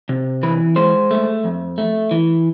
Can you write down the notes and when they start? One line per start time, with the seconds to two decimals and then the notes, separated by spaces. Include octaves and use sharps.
0.09 C3
0.43 E3 B4
0.76 G#3 C5
1.11 A3
1.44 F2
1.78 A3
2.11 E3